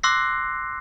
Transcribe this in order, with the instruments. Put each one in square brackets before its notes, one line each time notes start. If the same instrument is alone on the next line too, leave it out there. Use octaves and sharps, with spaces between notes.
[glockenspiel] C6 D6 E6 F#6 A#6 C7